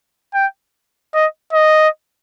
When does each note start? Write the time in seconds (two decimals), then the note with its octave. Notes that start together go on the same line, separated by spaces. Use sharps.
0.34 G5
1.14 D#5
1.52 D#5